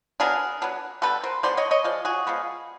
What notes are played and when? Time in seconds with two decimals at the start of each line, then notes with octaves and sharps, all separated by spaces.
0.20 F#3 B3 D4 G#4 A#4
0.62 F#3 B3 D4
1.02 D3 G3 B3 A4 B4
1.23 A#4 C5
1.43 D3 G3 B3 C5 D5
1.57 C#5 D#5
1.71 C#5 D#5
1.84 F3 G#3 D5
2.05 F#4 G#4
2.27 F3 G#3 B3